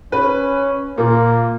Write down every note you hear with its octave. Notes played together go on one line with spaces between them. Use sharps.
C#4 B4
A#2 A#3